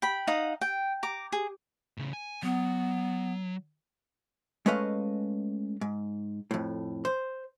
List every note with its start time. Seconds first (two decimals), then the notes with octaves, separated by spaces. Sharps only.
0.02 G5 B5
0.27 D#4 F5 F#5 D#6
0.61 G5
1.03 A#5 D6
1.32 G#4
1.98 A2 C#3
2.13 G#5
2.43 F#3 B3
4.66 G#3 A3 C#4 B4 D#5 F5
5.81 G#2
6.51 F2 A2
7.05 C5